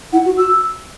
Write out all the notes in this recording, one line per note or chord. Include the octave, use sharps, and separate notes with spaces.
E4 F#5
F#4
F#4 E6